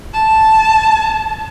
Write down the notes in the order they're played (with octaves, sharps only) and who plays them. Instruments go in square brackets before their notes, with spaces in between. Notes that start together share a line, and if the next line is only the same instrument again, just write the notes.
[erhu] A5